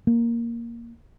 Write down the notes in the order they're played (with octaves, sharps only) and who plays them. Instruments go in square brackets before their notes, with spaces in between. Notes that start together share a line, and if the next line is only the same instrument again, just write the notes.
[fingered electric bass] A#3